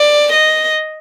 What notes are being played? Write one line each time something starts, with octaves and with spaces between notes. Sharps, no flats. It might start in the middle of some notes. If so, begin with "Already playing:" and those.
Already playing: D5
D#5